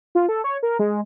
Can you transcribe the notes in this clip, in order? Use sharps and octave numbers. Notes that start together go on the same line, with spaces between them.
F4
A4
C#5
A#4
G#3